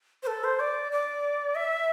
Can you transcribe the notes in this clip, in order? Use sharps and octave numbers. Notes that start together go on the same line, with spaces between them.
C5
A4
C5
D5
D5
E5